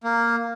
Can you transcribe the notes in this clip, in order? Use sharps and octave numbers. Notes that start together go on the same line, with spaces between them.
A#3